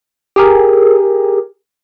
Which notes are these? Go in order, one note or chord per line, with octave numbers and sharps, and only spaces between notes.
G4 G#4 A#4